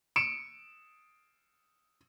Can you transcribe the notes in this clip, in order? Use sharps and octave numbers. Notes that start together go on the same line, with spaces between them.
C#7 D7 E7